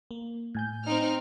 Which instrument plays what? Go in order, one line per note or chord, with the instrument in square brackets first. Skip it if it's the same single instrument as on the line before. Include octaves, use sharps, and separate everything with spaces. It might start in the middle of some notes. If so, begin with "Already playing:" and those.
[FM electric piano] A#3
A2 G#5 G6
[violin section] C4 D#4 F6